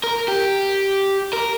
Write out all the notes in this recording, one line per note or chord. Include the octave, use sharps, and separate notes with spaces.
A#4
G4
A#4